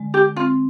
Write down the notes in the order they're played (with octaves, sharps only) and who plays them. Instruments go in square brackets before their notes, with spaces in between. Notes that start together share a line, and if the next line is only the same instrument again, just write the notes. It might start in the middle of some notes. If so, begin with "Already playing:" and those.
Already playing: [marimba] D3 G#3
[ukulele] G4
[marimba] C4 [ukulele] F4